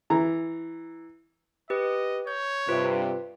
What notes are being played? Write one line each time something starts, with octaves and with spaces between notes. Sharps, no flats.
E3 A#5
G4 B4 D#5
C#5 G6
G2 C3 F4 B4